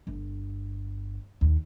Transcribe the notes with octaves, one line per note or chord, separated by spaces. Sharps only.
G1
D#2 D#3